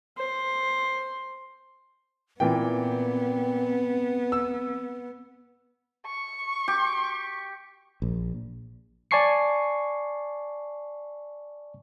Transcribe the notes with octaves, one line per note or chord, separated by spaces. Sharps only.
C5
A#2 E3 B3 C4 G5
E6
C#6
G4
A#1
D5 G#5 A5 C#6 C7 C#7